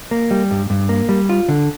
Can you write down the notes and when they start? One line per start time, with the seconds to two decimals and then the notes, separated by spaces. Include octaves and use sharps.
0.11 A#3
0.31 G3
0.51 G2
0.70 G2
0.89 A#3
1.09 G3
1.29 F4
1.49 D3